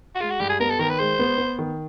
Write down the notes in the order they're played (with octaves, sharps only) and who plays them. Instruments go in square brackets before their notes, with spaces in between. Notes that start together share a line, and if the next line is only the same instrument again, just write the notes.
[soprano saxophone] F#4
[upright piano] G#3 [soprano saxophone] F4
[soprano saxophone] F#4
[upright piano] G2 [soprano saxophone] G4
[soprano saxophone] G#4
[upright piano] B3 [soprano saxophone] A#4
[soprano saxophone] A4
[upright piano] D#3 [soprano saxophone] A#4
[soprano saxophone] B4
[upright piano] G#3 [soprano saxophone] C5
[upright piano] B3
B3
D#3